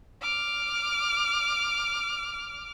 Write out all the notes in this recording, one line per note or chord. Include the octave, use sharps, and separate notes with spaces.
D6 F6